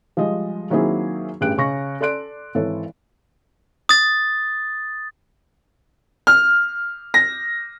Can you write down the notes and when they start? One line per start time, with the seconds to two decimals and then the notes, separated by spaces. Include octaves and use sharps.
0.17 F3 G3 G#3 D#5
0.70 D#3 F#3 A#3 C4 E4 G#4
1.41 A1 G2 G#4 G5 F#6 D7
1.58 C#3 C#6 A#6
2.01 A4 D5 C6 F#6 D7
2.55 G#1 E3 A4 C#5
3.89 D#6 A6
6.27 F6
7.14 A#6